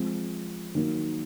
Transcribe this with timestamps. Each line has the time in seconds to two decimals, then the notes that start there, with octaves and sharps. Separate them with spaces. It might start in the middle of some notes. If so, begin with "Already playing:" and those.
Already playing: F3 G#3 C4
0.75 D#3 F#3 A#3 D#4